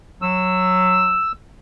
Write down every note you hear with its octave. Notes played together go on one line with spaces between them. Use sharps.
F#3 E6